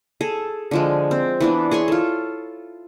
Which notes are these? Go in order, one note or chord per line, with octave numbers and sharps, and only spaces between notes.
G#4 A4
D3 F3 G#3
C4
E3 B3 D4
G#4 C#5 C6 C#6
F4 A4